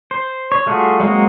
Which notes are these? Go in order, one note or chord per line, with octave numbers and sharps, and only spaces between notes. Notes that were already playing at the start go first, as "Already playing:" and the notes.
C5
C#5
G3 A3 F4 F#4 G#4
F#3 G#3 A#3 C4 F#4